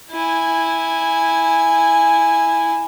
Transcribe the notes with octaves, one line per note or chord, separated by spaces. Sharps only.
E4 G#5